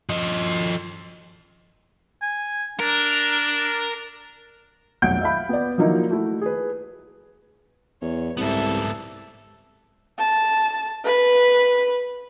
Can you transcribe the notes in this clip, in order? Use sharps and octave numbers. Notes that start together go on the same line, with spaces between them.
F3 D#5
G#5
D4 A#4
F1 B1 F#5 G6 D7
E5 F5 B5
B3 D5
F3 F#3 A#3 D#4 E4
A3 E4 F#4
G#4 B4
E2 C#5
C2 G#2 B3 A4 E5
A5
B4